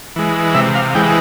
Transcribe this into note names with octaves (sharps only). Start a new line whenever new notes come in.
E3 G#3
C3 E5
F5
E3 G#3 G5